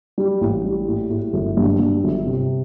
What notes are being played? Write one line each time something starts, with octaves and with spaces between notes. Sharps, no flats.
G3
A1
G3
A2
A2
G1
G2
G2
G1
C3